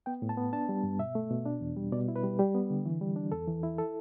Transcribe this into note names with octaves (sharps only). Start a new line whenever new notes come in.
B3 G5
A2
A5
B3
D4 A5
G3
G2
B2 E5
A3
B2
D4
E2
G3
B2 D5
E4
B4
G3
G3 G4
B3
D3
E3
G3
D4
E2 A4
E3
E4
A4